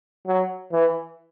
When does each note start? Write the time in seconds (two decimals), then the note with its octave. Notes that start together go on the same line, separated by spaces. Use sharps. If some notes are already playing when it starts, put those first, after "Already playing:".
0.27 F#3
0.72 E3